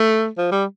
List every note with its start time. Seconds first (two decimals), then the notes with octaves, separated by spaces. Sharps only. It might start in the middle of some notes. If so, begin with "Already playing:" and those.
Already playing: A3
0.37 F3
0.51 G3